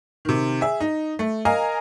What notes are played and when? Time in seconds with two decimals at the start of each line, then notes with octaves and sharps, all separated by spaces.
0.25 C3 D#3
0.61 G#4 E5
0.81 D#4
1.19 A3
1.45 A#4 D#5 F5 G#5 A#5